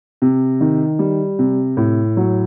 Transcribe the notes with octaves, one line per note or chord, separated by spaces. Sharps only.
C3
D#3
G3
C3
A2
F#3